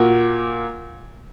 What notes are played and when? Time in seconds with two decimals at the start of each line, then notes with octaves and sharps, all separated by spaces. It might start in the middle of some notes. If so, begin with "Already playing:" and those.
Already playing: A#2 A#3 F#4